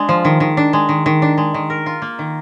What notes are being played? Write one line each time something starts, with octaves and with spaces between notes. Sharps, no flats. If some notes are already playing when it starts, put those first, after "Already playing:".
Already playing: G#3 D4
F3
D#3
D#3
D4
G#3
D#3
D#3
D4
G#3
D#3
A#4
F4
A#3
D#3